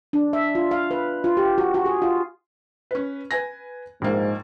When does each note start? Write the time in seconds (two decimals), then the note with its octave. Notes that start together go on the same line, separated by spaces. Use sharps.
0.13 D4
0.33 E5
0.55 F4
0.71 F5
0.91 B4
1.24 F4
1.37 G4
1.58 F#4
1.74 F#4
1.86 G#4
2.02 F4
2.91 C#4 B4
3.31 B4 G#5 A#6
4.02 A#1 G#2 A#3